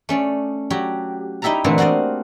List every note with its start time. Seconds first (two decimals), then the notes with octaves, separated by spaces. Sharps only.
0.09 A3 C#4 D5
0.70 F#3 F#4 G4
1.42 D#4 E4 G4 E5 A5 A#5
1.64 A#2 D3 E3 A3 A#3 C4
1.78 F#4 C5 D5 D#5 F5